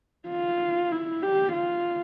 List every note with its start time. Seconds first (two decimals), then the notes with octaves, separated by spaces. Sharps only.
0.29 F4
0.92 E4
1.23 G4
1.53 F4